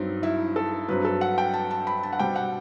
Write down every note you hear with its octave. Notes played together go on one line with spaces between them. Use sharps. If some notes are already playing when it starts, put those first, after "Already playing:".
Already playing: G2 F#3 C4 D#4
E4
A4
G2 F#3 C4 B4
A4
F#5
G5
A5
A5
B5
A5
F#5
B2 G3 C4 G5
F#5